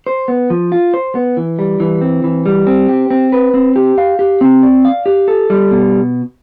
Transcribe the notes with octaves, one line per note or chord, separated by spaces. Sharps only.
C5
B3
F3
F4
C5
B3
E3
G3
E3
C4
E3
G3
C4
G4
C4
B4
C4
G4
F5
G4
C4
D5
F5
G4
A4
G3
B2